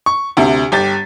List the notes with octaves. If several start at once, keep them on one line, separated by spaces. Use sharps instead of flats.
C#6
D2 C3
G1 G4 A6